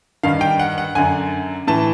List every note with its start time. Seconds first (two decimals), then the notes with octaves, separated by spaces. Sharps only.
0.23 G2 D#3 F5
0.41 G5
0.59 F#5
0.78 F#5
0.95 F#2 D3 G#5
1.67 A2 E3 A5